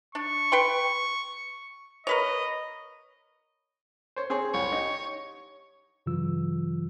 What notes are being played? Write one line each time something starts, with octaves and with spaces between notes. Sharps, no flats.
D4 C#6
B4 G5 C6
A#4 B4 C#5 D#5
C5 C#5
C4 G#4 C#5
C2 C#5
D#4 G4
G2 C#3 E3 F#3 F4 E6